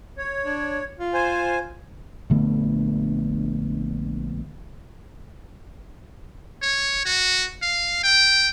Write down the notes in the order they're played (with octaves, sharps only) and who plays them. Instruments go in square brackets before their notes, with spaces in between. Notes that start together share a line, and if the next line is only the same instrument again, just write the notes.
[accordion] C#5
[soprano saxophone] D4
F4
[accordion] C5 G#5
[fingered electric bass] A#1 D3 A3 B3
[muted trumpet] C#5
F#4
F5
G5